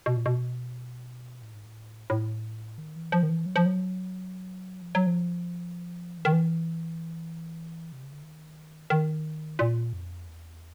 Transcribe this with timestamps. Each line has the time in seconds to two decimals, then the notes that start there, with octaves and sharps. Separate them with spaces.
0.06 B2
0.17 A#2
0.26 B2
1.42 A2
1.54 G#2
1.65 A2
2.10 A2
2.78 D#3
2.96 E3
3.12 F3
3.23 D#3
3.29 E3
3.46 F#3
3.56 F3
3.66 F#3
4.82 F3
4.95 F#3
5.07 F3
6.18 E3
6.25 D#3
6.32 E3
7.92 C3
8.03 C#3
8.12 D3
8.23 D#3
8.90 D#3
9.59 A#2
9.93 F2
10.26 E2